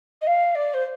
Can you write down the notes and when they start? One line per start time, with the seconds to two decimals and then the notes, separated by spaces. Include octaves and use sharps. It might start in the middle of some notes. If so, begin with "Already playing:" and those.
0.22 D#5
0.27 F5
0.55 D5
0.74 C5